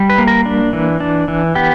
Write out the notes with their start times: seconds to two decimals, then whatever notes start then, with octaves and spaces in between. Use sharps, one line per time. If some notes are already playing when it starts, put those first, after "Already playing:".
Already playing: G3
0.10 B4
0.18 A#3
0.27 A#4
0.46 D4
0.73 E3
1.00 D4
1.28 E3
1.55 B3 G4